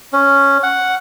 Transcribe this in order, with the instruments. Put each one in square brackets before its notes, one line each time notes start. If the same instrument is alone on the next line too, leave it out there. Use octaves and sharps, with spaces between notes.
[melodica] C#4
F#5